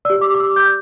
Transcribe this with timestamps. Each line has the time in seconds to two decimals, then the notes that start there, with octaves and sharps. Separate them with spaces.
0.05 G4 D5 E6
0.21 D6
0.35 D6
0.40 E6
0.56 G6